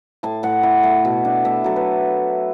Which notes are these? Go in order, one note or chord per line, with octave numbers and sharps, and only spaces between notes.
A2 A5
A2 F#5
E4
A3
B2
D4
A3 E5
F#3 A4
B4